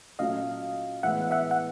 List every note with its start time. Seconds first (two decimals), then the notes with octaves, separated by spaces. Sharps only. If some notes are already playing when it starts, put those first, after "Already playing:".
0.19 A#2 F#3 A3 C#4 D#5 F5
1.03 A2 E3 G#3 B3 E5 F#5
1.31 E5 F#5
1.51 F#5